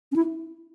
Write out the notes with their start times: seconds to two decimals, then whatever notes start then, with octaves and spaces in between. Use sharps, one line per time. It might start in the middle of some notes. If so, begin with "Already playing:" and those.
0.12 C#4
0.16 E4